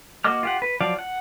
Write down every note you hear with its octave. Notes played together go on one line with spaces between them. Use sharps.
A#3 F#4 D#5 D6 F6
F4 G4 F#5
B4
F3 F#3 D5 F5
F#5